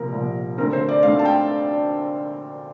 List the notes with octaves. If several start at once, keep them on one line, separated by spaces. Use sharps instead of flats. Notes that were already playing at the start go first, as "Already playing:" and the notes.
Already playing: C2 A#2 F3 A#4
C2 A#2 F3
D2 D3 A3 C4 A#4
C5
D5
D2 D3 A3 C4 F5
A5
G5